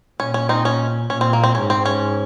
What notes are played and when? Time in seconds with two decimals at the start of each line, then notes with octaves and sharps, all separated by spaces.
0.19 A#2 C#4
0.34 C#4
0.49 C4 D#4
0.65 C#4
1.10 A#2 C#4
1.21 C4
1.33 A#3
1.43 C4
1.55 G#2 C#4
1.70 C4
1.86 C#4